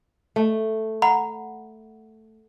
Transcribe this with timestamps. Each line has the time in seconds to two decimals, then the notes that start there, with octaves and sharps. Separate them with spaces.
0.36 A3
1.02 F#5 A#5 B5